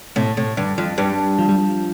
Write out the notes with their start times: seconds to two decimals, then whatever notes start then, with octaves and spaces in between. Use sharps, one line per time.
0.16 A2 C3
0.37 A2 C3
0.57 G2 D3
0.78 F2 F3
0.98 G2 G3
1.38 F3
1.49 G3
1.58 F3